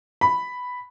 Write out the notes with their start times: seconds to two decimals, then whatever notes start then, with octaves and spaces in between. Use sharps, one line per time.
0.21 B5